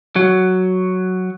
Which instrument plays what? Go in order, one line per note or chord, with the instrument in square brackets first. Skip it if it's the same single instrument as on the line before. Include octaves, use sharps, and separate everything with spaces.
[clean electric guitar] F#3